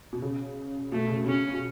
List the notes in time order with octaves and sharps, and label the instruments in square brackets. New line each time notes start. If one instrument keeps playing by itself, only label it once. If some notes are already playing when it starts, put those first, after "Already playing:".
[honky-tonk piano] B2
C#3
[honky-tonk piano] B2 [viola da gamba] A3
[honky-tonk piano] C#3
[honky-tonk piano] C#3 [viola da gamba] C#4
[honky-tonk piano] B2